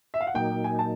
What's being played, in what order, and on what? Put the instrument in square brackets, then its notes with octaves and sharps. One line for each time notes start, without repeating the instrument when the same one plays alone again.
[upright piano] E5
F5
F#5
[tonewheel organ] A#2 F#3 A#3 D#4 [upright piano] G5
[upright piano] G#5
A5